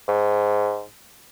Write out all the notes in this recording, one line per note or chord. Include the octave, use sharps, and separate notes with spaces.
G#2